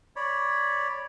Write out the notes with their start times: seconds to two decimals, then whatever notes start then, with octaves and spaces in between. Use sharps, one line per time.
0.16 C#5 D5 B5